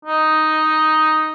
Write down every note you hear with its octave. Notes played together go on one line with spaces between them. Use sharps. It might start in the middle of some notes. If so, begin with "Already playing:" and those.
D#4